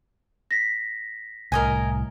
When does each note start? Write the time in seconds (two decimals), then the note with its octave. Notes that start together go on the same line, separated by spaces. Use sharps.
0.51 A#6 B6
1.52 C2 A2 A#4 D#5 G#5